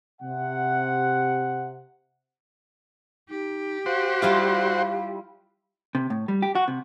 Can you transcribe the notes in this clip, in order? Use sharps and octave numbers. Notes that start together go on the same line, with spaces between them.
C3 F#5
D#4 G4
F#4 C5 F5
G3 E4 F4 F5
C3
A2
G3
G4
F#4
C3